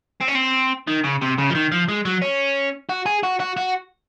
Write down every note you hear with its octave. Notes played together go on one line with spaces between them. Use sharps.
C4
C#4
C4
D#3
C#3
C3
C#3
F3
D#3
F3
G#3
F#3
C#4
F#4
G#4
F#4
F#4
F#4